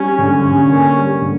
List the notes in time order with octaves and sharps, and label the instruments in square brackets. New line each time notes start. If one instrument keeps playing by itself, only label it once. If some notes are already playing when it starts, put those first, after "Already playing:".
Already playing: [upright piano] G3 [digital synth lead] C#4
[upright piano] D3
D3
A#3
G3
D3